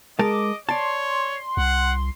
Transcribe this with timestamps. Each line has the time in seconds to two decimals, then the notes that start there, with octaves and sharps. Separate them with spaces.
0.19 G#3 A#4 D#5 A5 D6
0.69 C#5 D5 A5 C6
1.57 C2 F#5